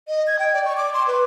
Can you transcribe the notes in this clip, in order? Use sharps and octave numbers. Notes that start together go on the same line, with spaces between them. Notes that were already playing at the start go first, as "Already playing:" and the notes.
D#5
G#6
G5
D5
C#6
D6
C6
B4